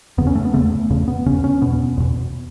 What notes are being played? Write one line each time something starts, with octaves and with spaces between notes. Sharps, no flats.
E2 C#3 B3
C#4
A3
B3
E2 C#3 A3
E2 C#3
B3
E2 C#3 C#4
C#4
E2 B2 B3
E2 B2